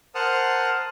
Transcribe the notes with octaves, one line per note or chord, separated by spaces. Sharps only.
A#4 C5 F#5 A5 D#6 F6